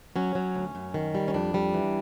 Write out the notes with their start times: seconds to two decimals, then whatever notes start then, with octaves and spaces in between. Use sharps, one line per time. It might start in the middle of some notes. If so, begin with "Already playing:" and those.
0.16 F#3 C#4
0.35 F#3
0.55 D2
0.75 F#2
0.94 D#3
1.15 G3
1.28 C#4
1.34 F2 D4
1.54 G3
1.74 E3